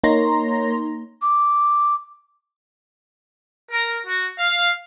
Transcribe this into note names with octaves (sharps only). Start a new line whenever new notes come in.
A#3 D#4 C#5 A#5 C6 A#6
D6
A#4
F#4
F5